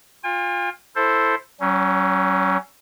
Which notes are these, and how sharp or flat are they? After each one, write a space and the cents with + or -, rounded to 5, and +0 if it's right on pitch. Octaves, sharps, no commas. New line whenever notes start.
F4 +15 G#5 -45
E4 +0 A4 +0 C5 +5
F#3 +40 C#4 +0